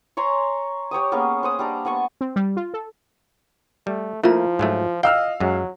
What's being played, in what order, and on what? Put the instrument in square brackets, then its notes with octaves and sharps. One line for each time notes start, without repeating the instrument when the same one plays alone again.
[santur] C#5 G#5 A#5 C6
G4 C#5 G5 D#6
A#3 B3 C#4 G#4
C5 F#5 D#6
G3 D4 A#5
B3 F#5 G#5 C#6
[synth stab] C4
G3
F4
A4
[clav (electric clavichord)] G3 [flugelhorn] A3
[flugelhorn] F3 [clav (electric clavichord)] A3 A#3 [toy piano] E4 F4 A#5
[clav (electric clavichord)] G#2 F#3 A3
[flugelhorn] D#5 [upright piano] F5 E6 F6 [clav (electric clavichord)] G5
[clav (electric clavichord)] F#2 G#3 [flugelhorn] F#3